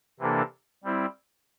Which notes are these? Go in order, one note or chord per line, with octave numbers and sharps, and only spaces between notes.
C3 E3 A#3 D4 A4
G3 C4 E4